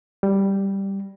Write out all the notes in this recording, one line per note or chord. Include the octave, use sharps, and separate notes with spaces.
G3